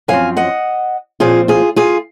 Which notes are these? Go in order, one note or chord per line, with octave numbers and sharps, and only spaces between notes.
F#2 F3 C4 F5 G#5
D#5 F#5
A#2 F3 C4 F4 G#4
F4 G#4
F4 G#4